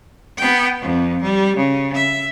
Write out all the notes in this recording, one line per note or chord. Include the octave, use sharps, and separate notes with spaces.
B3 G5
F2
G3
C#3
E5